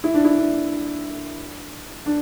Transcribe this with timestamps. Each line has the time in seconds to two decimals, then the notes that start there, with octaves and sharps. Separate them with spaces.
0.04 E4
0.14 D4
0.25 E4
0.38 D4
2.06 D4